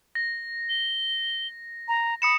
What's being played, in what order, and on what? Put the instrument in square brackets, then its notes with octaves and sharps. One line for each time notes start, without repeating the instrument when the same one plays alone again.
[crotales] A#6
[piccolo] G7
A#5
[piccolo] B5 [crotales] D#6 C#7 E7